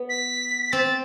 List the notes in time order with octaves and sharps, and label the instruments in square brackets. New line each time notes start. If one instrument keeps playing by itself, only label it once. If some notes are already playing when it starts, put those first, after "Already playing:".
Already playing: [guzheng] B3
[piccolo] B6
[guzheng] C4 [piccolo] A6